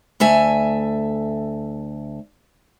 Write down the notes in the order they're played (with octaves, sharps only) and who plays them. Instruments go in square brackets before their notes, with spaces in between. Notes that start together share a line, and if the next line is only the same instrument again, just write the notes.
[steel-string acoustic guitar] D2 A3 E5 G#5